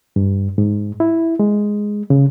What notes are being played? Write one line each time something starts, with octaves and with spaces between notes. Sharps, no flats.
G2
G#2
E4
G#3
C#3